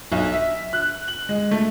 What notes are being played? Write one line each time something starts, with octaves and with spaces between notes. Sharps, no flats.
B1
E5
F#6
F#7
G#3
A3